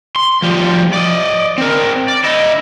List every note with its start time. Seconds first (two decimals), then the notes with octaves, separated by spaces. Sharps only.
0.16 C6
0.42 F3 G3
0.94 D5 D#5
1.58 C4 A#4
2.08 D5
2.24 E4 D#5